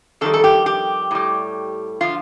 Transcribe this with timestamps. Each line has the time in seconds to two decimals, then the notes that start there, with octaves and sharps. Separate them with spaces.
0.21 F2 D#3 G3 A4
0.34 A4
0.44 G4
0.66 G4
1.11 A2 G3
2.01 D3 F3 F4